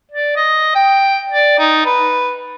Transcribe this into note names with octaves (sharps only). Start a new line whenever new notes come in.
D5
D#5
G5
D5
D#4
B4